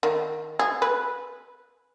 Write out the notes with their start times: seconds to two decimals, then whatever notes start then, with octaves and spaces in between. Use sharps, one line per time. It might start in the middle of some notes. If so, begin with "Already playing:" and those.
0.03 D#3
0.59 G#4
0.82 B4